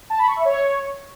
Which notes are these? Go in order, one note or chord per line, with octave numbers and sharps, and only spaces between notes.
A5
B5
C#6
E5
C#5